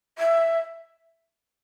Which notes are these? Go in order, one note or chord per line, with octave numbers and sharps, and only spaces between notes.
E5